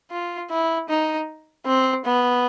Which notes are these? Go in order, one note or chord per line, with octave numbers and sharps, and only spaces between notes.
F4
E4
D#4
C4
B3